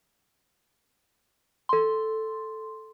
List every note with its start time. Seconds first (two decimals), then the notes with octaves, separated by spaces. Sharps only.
1.69 A4 C6